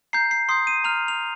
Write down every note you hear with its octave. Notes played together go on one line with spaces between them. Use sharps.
A#5 G6 C7
C7
C6 D#6 G6 C7
D#7
A#5 F6 F7
F7